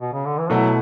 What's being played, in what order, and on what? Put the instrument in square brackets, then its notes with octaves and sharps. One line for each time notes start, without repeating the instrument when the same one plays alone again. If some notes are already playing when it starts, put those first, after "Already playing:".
[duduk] B2
C#3
D3
E3
[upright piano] B2 A3 E4 [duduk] F#3